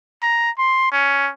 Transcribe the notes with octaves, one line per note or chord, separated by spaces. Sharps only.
A#5
C6
C#4